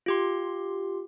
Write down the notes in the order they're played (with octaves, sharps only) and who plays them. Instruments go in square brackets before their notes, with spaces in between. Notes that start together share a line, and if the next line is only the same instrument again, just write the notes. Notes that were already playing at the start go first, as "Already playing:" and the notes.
[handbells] F4 G4 C6